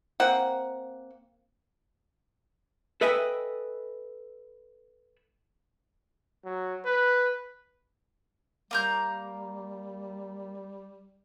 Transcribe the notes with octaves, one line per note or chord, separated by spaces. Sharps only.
A#3 C4 F#5
A4 B4 D#5 E5 G5 G#5
F#3
B4
G3 A#3 A#4 G6